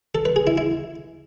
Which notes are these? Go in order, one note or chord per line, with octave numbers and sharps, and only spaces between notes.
A4
B4
G#4
E4
E4